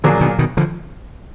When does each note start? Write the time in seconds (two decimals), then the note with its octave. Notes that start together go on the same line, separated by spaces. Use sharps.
0.04 A#2 D3 F3 F#3 A#3 D4 G#4
0.21 B2 D#3
0.39 B2 D#3
0.57 D3 F3